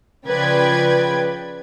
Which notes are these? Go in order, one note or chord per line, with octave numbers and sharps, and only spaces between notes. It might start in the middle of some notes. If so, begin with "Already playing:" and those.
C#3 F3 B4 D5 G5 G#6